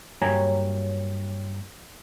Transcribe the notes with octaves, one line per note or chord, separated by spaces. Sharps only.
G2 F#3 A#3 C#5 G#5 A#5